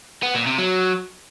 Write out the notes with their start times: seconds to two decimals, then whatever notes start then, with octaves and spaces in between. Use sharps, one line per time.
0.23 B3
0.35 A#2
0.47 C3
0.58 F#3